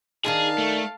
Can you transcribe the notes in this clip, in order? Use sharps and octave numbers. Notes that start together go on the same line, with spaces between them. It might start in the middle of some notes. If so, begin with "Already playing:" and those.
D#3 D4 D#4 G#4 F5 A5
A3